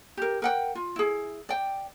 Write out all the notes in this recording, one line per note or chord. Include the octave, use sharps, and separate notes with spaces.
G4 A#4
A#4 F#5 G5
F4
E4 G#4
D5 G5